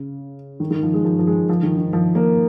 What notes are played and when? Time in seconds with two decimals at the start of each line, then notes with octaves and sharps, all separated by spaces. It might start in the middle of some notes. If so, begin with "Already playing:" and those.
Already playing: C#3
0.60 D#3
0.71 D#3
0.83 F3
0.94 G#3
1.05 F3
1.19 F3
1.27 G#3
1.49 F3
1.63 D#3
1.78 D#3
1.93 F3
2.15 A#3